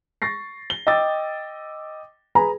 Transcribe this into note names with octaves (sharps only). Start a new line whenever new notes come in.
C#6 A6 A#6 C7
G7
D#5 G5 D6 E6 A6
G#4 B4 G#5 A#5 B5